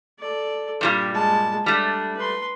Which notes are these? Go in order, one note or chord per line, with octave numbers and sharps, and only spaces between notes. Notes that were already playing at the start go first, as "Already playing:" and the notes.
A4 D5
G2 A#2 G3 G4
G#3 A5
G3 A3 D4
B4 C6